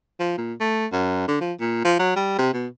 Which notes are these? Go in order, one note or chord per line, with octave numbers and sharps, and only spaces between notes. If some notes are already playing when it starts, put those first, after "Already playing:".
F3
A#2
A3
F#2
D3
F3
A#2
F3
F#3
G3
C3
B2